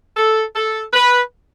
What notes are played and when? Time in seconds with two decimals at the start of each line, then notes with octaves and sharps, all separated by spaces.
0.17 A4
0.55 A4
0.93 B4